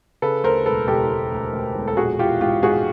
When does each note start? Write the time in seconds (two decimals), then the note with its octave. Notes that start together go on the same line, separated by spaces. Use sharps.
0.22 C#3 A4 B4
0.44 D2 A#4 C5
0.66 E1 A4 B4
0.87 E1 G4 A4
1.09 E1
1.32 D2
1.53 D2
1.75 E1
1.88 A4
1.97 A#1 F#4 G#4
2.19 E3 F4 G4
2.41 G#2 F4 G4
2.63 G#2 F#4 G#4